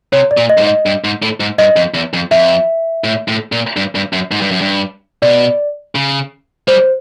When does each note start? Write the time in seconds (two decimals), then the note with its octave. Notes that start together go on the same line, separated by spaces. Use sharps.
0.13 C3 C#5
0.31 D5
0.37 A#2
0.49 D#5
0.58 G2
0.61 G#2
0.67 D#5
0.86 G2
1.04 G#2
1.22 A2
1.40 G#2
1.58 G2 D#5
1.76 F2
1.94 E2
2.14 F2
2.31 F2 E5
3.04 A2
3.28 A2
3.52 A#2
3.77 G2
3.95 G2
4.13 F#2
4.31 G#2
4.41 G2
4.51 F#2
4.61 G2
5.22 B2 D5
5.95 C#3
6.68 G3 C5